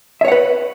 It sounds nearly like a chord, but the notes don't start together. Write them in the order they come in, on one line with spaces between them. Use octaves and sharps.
E5 C#5 F#5 B4